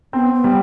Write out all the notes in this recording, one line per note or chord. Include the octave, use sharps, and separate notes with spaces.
B3 C4
B3
G3